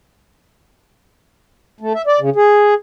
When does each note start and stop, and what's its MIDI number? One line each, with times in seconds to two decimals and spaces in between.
1.81 1.93 57
1.95 2.02 76
2.07 2.20 74
2.20 2.30 49
2.36 2.74 68